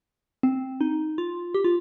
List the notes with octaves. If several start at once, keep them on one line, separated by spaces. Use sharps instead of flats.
C4
D#4
F4
G4
F4